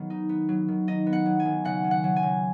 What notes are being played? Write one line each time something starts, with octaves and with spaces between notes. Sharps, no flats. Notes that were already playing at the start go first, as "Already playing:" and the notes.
Already playing: D#3 F#3 B3 G#4
D#4
B3
F#3
D#3
D#4 D#5
B3
F#5
F#3
G#5
D#3
C#3 F#5
C#4
F#5
F#3
G#5
C#3